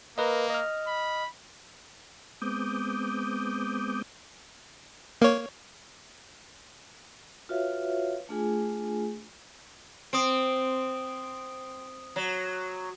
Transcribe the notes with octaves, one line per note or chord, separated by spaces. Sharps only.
A#3 A#4 B4 D#5
D#5 F6
B5
G#3 B3 C4 D6 D#6 G6
A#3 C#5
F4 F#4 B4 C#5 E5 F5
A3 D4 F4 G#4 G#5
C4 D#6 D7
F#3